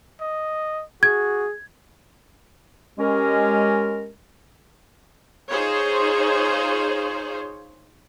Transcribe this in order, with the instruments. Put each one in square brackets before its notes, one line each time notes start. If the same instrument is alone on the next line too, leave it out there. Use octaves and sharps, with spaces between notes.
[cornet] D#5
[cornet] F#4 [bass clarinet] G#4 [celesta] G#6
[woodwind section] G#3 C#4 G4 A#4
[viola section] D#4 F4 G#4 C5 C#5